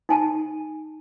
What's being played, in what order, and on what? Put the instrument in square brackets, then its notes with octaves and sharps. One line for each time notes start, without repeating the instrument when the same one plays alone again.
[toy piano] D#4 G#5 A5